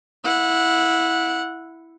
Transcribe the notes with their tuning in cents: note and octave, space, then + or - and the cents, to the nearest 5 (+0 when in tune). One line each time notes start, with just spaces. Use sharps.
E4 +0 F#5 -20